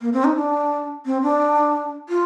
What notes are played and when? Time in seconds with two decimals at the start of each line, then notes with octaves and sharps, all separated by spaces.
0.01 A#3
0.13 C4
0.24 D#4
0.36 D4
1.06 C4
1.23 D4
2.09 F4